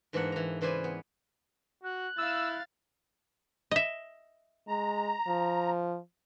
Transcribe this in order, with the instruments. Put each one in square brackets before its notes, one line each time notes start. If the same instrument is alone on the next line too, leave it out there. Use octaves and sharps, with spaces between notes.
[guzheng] G#2 E3 G#3 A#3 D4 F#5
E3 A#5
C#3 E3 B4 C5 D5 G#5
B3
[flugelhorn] F#4 [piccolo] F#6
[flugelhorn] E4 [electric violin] F5 A6 [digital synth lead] E6
[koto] D#5 E5
[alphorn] G#3 [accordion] A#5
[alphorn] F3